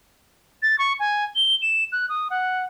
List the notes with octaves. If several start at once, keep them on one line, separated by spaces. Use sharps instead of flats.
A6
C#6
G#5
G7
E7
F#6
D#6
F#5